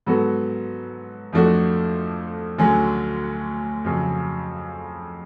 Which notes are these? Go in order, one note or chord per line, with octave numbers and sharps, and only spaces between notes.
G#2 F#3 B3 F#4 A4
F2 F3 A3 D4 F#4
D2 D3 F#3 C#4 G#4
F2 C#3 F#3